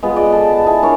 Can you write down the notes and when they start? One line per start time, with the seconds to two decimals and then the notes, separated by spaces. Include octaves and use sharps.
0.03 G#3 B3 F4
0.16 D5 D#5
0.32 A4
0.51 A5
0.66 E4 G#4 A4 G#5
0.82 D4 A#4 C#5